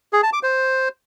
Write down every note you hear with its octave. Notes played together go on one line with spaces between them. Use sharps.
G#4
A5
D6
C5